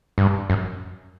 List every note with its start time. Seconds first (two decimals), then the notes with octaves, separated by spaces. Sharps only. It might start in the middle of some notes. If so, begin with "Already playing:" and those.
0.18 G2
0.50 F#2